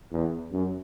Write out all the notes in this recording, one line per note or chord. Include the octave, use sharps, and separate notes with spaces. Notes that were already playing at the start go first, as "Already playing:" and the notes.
E2
F#2